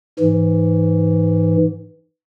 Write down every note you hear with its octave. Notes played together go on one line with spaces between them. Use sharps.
G#2 E3